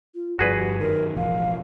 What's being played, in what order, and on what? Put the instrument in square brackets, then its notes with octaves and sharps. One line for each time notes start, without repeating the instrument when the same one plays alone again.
[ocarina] F4
[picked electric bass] G1 G2 F3 [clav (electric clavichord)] F#4 G#4 B4 [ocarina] D5
[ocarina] G4
[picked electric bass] F#2 D#3 [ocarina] A#4
[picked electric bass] E1 A1 F3 [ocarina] F5